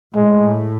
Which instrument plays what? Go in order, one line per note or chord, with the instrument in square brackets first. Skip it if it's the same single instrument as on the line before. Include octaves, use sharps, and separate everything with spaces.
[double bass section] A2 [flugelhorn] G#3